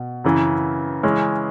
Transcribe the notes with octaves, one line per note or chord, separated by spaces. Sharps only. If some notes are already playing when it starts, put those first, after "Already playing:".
Already playing: B2
F#2 C#3 E3
C#3 E3 G#3 C#4